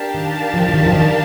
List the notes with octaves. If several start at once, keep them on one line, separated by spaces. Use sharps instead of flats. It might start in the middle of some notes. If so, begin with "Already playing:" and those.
Already playing: D4 G4 A#4 F5 A5
D#3
F3
F3
D#3
F3
D#3